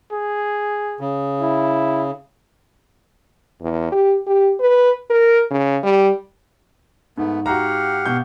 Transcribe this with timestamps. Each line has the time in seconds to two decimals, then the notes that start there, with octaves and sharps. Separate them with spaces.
0.12 G#4
1.00 C#3
1.41 E4
3.62 E2
3.92 G4
4.27 G4
4.60 B4
5.10 A#4
5.51 C#3
5.83 G3
7.18 G#2 A3 B3
7.46 F#4 G4 F5 F#5 A#5
8.06 B2 G6